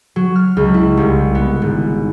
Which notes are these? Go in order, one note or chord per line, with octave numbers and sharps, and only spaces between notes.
F#3
F6
C#2
E4
C2
B3
G#1